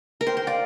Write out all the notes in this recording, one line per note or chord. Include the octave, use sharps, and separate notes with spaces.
A#4
C5 G5
C5 G5
D5 F5